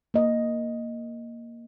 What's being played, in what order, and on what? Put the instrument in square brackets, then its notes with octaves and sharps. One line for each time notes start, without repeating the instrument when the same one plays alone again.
[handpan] A#3 D#5